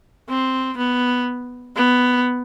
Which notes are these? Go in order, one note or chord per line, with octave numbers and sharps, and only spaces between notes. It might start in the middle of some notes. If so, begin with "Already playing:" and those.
C4
B3
B3